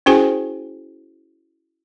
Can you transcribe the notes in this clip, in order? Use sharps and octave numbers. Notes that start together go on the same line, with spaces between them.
C#4 E4 F#4 G#4 C5 G#5